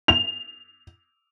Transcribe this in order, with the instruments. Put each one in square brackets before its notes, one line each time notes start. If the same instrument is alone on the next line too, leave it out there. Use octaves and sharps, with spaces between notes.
[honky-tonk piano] F7